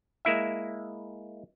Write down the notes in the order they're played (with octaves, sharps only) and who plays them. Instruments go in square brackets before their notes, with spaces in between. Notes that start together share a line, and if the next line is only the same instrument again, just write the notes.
[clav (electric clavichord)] G#3 A#3 E4 E5